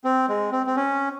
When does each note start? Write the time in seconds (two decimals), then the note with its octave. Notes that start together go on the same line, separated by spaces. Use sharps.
0.04 C4
0.28 G#3
0.52 C4
0.66 C4
0.76 C#4